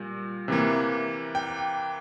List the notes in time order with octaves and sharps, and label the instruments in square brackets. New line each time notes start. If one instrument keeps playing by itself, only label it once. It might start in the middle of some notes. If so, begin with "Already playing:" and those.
Already playing: [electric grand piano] A#2 G3
C3 E3 A#3
G5